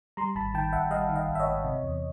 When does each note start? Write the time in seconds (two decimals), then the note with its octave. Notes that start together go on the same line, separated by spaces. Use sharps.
0.17 G3 A#5 C6
0.35 G#1 A5 B5
0.54 D#3 G5 A5
0.73 G#1 E5 F#5
0.91 G3 D#5 F5
1.09 D#3
1.15 D#5 F5
1.28 G#1
1.35 E5
1.40 C#5 D#5
1.46 G#2
1.64 C3
1.83 E2